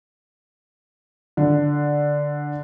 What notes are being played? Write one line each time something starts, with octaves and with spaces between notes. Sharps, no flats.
D3